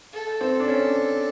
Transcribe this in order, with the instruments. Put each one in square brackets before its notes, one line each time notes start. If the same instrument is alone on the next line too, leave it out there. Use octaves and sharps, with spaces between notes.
[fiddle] A4
[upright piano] C4
D4
C#4